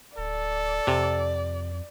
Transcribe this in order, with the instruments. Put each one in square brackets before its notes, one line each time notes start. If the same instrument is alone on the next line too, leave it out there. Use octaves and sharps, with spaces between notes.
[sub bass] D1 [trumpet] A4 [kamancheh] D5
[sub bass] F2 [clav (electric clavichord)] C3